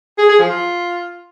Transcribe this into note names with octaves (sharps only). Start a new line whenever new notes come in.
G#4
G#4
F3
F4